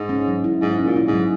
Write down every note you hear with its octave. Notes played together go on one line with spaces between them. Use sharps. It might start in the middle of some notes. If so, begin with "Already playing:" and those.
Already playing: G#2
C#4
F#3
E4
G#2 F#3
C#4
A#2
E4
G#2
F#3